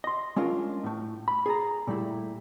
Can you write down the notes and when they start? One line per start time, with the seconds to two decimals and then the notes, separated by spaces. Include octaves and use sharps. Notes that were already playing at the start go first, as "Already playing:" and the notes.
0.04 D#5 C6
0.36 G#3 C#4 D4 F4 A#4
0.83 A2 A3
1.28 B5
1.46 G#4 D5 A#5
1.87 A#2 G3 A3 E4